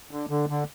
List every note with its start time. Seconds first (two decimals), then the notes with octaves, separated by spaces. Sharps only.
0.11 D3
0.30 D3
0.50 D3